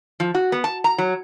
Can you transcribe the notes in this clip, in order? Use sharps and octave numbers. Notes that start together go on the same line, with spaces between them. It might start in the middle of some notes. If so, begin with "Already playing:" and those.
F3
F#4
B3
A5
A#5
F#3